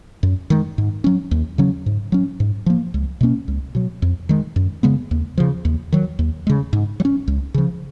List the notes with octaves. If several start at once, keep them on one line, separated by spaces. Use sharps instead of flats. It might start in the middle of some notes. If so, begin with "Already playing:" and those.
F#2
D#3 G#3
G#2
F#3 C#4
D#2
C#3 F#3 C#4
G#2
F#3 C#4
G#2
F3 A#3
C#2
B2 A#3 C#4
C#2
B2 F#3
F2
D#3 G#3
F#2
C#3 G#3 B3
D#2
C#3 F3
D#2
D#3 F#3
D#2
C#3 G#3
G#2
F#3
C#4
C#2
C#3 F3